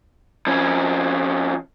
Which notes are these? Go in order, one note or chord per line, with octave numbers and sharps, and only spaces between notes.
F2 C#4